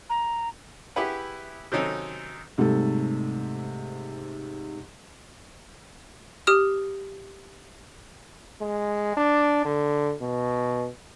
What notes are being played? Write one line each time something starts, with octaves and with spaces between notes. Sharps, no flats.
A#5
E4 G4 G#4 B4 F#5
C3 D#3 F#3 C#4 D#4 A4
G#2 C3 G3 A3 A4
G4 D#6 F6
G#3
D4
D3
B2